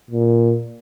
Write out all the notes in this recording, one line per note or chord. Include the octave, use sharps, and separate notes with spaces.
A#2